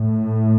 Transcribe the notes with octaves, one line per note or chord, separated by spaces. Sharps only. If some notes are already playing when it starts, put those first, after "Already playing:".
Already playing: A2